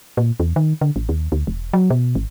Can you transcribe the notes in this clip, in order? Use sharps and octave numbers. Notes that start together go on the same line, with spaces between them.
A#2
E2
D#3
D3
A1
D#2
D2
E1
F#3
B2
G#1